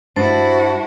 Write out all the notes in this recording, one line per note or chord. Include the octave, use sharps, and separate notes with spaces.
G2 E4 F#4 C5 A5